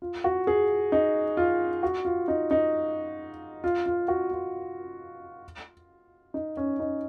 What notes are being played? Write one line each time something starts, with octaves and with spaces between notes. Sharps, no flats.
F4
F#4
G#4
D#4
F4
F#4
F4
D#4
D#4
F4
F4
F#4
F4
D#4
C#4
D#4